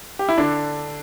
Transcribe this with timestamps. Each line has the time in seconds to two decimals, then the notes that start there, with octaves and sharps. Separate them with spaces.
0.19 G4
0.29 E4
0.38 D3 D4